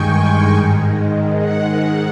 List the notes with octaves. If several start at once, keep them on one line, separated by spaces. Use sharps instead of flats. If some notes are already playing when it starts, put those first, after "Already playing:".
Already playing: G2 D#3 G#3 G5 G#5 C#6
G#2 D#3 G#3
F#5